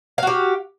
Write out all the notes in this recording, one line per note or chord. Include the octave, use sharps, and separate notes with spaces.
F#4 G4 F5